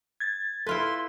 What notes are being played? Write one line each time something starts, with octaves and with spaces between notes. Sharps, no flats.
G#6 A6
E4 F4 A4 B4 C6